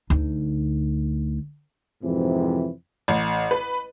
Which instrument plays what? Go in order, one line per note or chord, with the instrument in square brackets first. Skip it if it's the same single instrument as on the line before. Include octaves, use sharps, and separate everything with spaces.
[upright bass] D2 D#4
[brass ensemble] F2 G#2 C3 E3
[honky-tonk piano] A1
B4